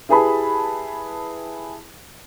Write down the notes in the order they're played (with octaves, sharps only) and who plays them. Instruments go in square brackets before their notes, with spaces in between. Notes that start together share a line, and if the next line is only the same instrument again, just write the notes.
[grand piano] E4 G4 G#4 B4 A5 B5